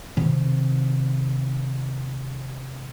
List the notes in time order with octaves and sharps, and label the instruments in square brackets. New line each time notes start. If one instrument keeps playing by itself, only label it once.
[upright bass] C3 D#3